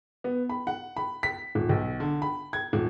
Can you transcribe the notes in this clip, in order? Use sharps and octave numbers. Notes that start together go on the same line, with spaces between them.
B3
B5
F#5
B5
B6
D#1
B1
D3
B5
G#6
D#1